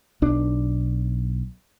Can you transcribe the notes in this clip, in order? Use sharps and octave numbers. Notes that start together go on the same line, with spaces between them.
B1 D4